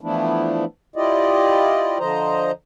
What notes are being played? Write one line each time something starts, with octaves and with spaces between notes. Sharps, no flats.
E3 F3 A3 B3 D4 E4
E4 F4 G4 D5 D#5
D3 F3 C5 D#5 A#5